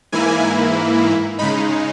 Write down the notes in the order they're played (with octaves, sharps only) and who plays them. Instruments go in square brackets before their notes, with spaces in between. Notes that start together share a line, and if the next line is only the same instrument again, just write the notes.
[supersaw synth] G#2 E3 A#3 E4 G#5
C#3 G#3 D#4 B5